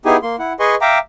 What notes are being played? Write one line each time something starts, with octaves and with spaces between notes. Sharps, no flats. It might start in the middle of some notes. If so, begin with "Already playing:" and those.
B3 D#4 E4 G4 G#4 G#5
A#3 C6
E4 F#5
G#4 B4 D#5 G#5 C6 C#6
E5 F5 G5 A#5 D6